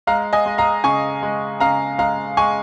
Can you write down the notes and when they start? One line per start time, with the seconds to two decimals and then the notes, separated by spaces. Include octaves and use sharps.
0.07 G#3 F5 A#5
0.33 D#5 G#5
0.46 G#3
0.58 F5 A#5
0.84 C#3 G#5 C#6
1.23 G#3
1.60 C#3 F5 A#5
1.98 G#3 F5 A#5
2.37 G#3 G#5 C#6